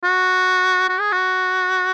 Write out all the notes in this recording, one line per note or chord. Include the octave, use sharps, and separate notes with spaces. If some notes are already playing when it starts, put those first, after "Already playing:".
F#4
F#4
G#4
F#4